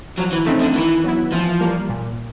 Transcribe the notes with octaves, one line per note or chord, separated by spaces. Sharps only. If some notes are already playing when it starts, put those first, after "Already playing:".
F3 F#3
E3
C#3 A3 C4 D#4
D3
D#3 E3
F#3 B3 E4
E3 F3
G3 A#3
A#2